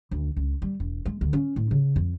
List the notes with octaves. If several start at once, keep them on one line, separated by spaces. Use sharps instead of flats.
D2
C#2
G3
E1
G#3
D2
C#4
A2
C#3
F2